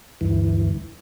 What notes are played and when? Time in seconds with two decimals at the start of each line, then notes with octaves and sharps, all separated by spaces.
0.21 D2 G2 E3